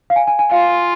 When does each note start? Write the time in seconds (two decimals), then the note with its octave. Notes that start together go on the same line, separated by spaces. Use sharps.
0.10 F5
0.16 G#5
0.27 G#5
0.39 G#5
0.51 F4 F5